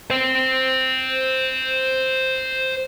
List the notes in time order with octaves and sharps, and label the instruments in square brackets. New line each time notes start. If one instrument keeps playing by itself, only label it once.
[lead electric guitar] C5 G5